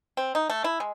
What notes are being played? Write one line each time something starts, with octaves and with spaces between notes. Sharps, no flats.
C4
D#4
A3
E4
G#3